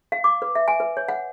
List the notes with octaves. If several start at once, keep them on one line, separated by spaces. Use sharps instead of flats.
F5
D6
B4
E5
G#5
B4
C#5
F#5